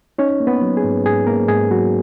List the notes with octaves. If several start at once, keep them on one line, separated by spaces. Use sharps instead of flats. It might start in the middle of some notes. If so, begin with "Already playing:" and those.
C#4 D#4 C#5
A#3
B3 B4
F#3
G#4
G#2
G#2 G#4
A#3 A#4
G#2 G#4
F#3 F#4